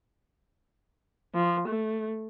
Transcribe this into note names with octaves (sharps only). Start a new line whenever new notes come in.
F3
A3